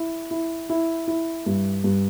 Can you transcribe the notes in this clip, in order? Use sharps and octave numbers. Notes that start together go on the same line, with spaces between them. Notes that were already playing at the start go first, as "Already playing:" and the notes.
Already playing: E4
E4
E4
E4
G2
G2